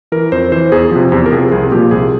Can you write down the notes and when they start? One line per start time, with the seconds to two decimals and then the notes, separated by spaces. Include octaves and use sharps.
0.12 E3 A#4
0.32 F2 C5
0.52 E3 C5
0.72 E2 G#4
0.91 C3 F3
1.12 E2 G4
1.26 A#4
1.32 C3 F3 G#4
1.51 C2 G#4
1.72 A#2 F3 G4
1.91 C2 G#4